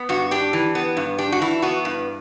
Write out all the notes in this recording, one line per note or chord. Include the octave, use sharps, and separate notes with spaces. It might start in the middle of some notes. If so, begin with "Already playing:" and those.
Already playing: B3
G2 F#4
D4 G4
E3
B3
G2
D4 G4
F#4
E3 E4
B3 F#4
G2